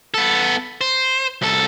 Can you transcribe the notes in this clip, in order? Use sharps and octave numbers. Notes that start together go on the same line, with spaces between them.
B3 A4
C5
C2 A4